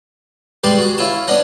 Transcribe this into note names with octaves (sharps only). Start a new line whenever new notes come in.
G3 G#3 B4 D5 A5 C6
F#4 G#4
C#4 E4 F4 A5
B3 C#4 D4 D#5 F#5